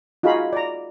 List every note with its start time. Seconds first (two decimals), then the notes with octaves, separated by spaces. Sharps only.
0.23 D#4 F4 F#4 G#4 F5 B5
0.53 D5 A#5